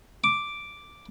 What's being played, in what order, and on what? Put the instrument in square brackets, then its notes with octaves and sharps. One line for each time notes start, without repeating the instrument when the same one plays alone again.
[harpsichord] D6